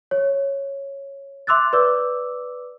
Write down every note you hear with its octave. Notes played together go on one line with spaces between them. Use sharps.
C#5
E5 C6 D6 E6 F#6 A6
B4 D5 D6 E6